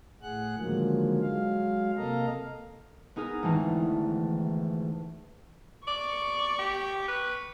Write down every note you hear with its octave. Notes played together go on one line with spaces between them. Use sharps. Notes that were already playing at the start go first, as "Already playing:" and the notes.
A2 G#4 F#5 F#6
D3 D#3 F3 F#3 G#3 A#3
F#3 G#3 F5
C3 A#3 A4 D#5 F5 A#5
B3 D#4 G#4 A#4
G#1 D2 E3 A5
D5 C#6
G4
B4